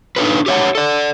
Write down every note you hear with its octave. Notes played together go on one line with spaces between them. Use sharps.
D4 D#4 F4 A4 B4
G4 G#4 C#5 D#5 E5 F#5
A4 D5